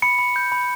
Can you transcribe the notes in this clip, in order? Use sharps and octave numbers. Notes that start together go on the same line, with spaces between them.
B5 C#7
B5
G6
B5